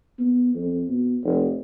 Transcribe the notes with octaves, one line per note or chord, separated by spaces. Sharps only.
B3
F2
B2
F1